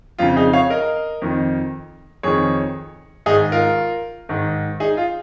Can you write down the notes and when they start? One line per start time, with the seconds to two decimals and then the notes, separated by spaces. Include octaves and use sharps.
0.18 F2 C#3 F4
0.36 D#4 G#4
0.53 C#5 F5
0.70 A#4 D#5
1.22 F2 D#3
2.23 F2 D#3 G#4 C#5
3.26 G#2 D#3 D#4 G#4
3.52 F4 A#4
4.29 G#2 D#3
4.80 D#4 G#4
4.97 F4